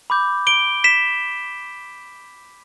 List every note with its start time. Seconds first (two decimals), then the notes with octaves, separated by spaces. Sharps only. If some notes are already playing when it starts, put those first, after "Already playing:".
0.10 B5 D6 G6
0.47 D7 G7
0.84 B6 E7